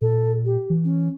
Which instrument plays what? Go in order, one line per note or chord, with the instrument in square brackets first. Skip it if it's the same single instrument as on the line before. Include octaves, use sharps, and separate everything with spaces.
[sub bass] A#2 [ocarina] A4
[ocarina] G4
[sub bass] E3
[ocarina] C#4